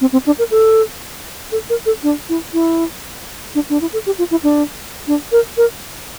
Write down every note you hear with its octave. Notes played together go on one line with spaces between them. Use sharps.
C4
C4
D4
A#4
A4
A4
A#4
A4
D4
E4
E4
D4
D4
E4
A4
G4
F4
E4
D4
D4
A#4
A#4